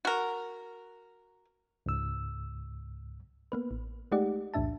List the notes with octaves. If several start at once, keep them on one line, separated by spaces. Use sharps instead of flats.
F#4 A#4
C#2 G#2 E6
A#3 B3 B4
A1
G#3 A3 D#4 G4 D5 F#5
B1 E2 A2 D4 E5 A5